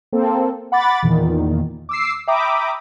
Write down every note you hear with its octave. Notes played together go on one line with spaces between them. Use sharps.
A#3 C4 A4
F#5 B5 D6 A6
E2 A#2 D#3
D6 E6 C7
E5 G5 A#5 B5 D6 D#6